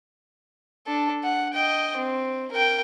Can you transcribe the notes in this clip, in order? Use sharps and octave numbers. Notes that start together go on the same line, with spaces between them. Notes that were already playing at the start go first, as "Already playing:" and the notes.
D4 A4
F#5
D#5 G5
C4
A#4 G5